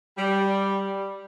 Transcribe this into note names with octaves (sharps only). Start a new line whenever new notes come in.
G3